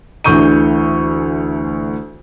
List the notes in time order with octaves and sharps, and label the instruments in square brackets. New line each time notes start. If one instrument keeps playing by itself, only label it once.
[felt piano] D2 D3 E3 C#6 G6 D#7